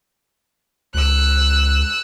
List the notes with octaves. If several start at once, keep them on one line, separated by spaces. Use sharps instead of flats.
C#2 E6 F#6